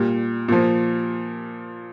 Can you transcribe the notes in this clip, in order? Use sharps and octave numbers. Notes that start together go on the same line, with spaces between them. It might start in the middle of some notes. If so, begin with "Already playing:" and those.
Already playing: A#2 G3
A#2 F3